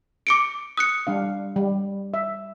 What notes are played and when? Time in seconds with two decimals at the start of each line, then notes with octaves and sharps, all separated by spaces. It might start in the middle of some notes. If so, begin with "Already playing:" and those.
0.27 D6 C#7 D7
0.77 D#6 F#6 C#7
1.07 G3 D4 F5
1.56 G3
2.14 E5